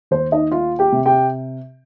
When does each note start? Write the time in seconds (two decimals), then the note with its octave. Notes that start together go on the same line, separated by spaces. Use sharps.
0.11 D#2 C5
0.32 D#4 D#5
0.51 F4 F5
0.79 G4 G5
0.92 C3
1.06 G4 G5